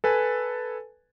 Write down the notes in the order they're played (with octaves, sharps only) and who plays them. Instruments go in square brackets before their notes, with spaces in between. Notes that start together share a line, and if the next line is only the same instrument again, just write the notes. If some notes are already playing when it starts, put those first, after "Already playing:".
[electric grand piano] A4 B4 G#5